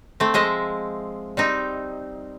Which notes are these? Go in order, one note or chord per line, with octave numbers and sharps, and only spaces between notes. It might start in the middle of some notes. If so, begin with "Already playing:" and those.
A3 C4
F3 G#3 D#5 E5
G3 C4 D#4